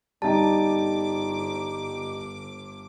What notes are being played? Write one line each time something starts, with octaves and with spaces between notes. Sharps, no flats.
G1 G3 D#4 A5 D6